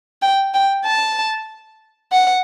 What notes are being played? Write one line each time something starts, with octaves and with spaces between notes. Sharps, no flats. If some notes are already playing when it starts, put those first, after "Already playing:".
G5
G5
A5
F#5